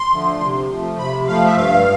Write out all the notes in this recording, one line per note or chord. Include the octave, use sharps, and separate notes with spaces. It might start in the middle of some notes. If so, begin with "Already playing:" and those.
Already playing: C6
D3 F3 A3
C3
F3 A3
C3 B5
F3 A3 F5
E5
G2 F5